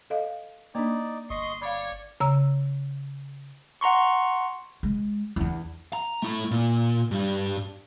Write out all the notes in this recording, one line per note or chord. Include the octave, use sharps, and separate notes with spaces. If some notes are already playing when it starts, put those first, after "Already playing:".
A4 D#5 F5
A#3 D4 D#4 D5
G1 D#5 C6 C#6 D#6
C#5 D5 F5 B5
C#3 A#5 E6
F#5 A#5 C6 C#6
G#3
E2 D4
A#5
A3 E4
A#2
G2 G3